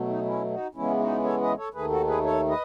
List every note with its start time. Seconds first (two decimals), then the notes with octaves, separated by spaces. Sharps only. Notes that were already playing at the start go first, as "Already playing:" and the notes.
Already playing: B2 F#3 A3
0.09 D#4
0.25 C#4 E4
0.50 D#4 F#4
0.75 E2 C#3 E3 G#3 B3 C#4 E4
0.99 D#4 F#4
1.24 A4 C#5
1.41 B4 D#5
1.57 A4 C#5
1.74 D#2 D#3 A3 G#4 B4
1.90 F#4 A4
2.07 G#4 B4
2.24 A4 C#5
2.49 B4 D#5